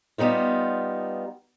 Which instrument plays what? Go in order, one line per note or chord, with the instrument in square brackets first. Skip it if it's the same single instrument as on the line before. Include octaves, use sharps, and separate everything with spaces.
[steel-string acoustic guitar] G3 B3 D#4 F4